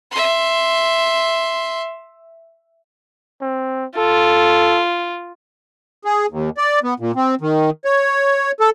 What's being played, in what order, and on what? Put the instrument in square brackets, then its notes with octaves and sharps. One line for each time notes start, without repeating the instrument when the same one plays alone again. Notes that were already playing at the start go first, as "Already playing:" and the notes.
[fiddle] E5 C6
[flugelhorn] C4
[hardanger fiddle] F4 [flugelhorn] A4
[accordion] G#4
D#2
D5
B3
A#2
C4
D#3
C#5
A4